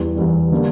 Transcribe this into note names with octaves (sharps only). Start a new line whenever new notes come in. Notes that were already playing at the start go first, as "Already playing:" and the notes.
Already playing: E2 E3 G3
E2 E3 G3
D3 G3 A#3 D4